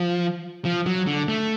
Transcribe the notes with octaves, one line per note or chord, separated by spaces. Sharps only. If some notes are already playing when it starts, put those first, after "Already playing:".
Already playing: F3
F3
F#3
D3
A3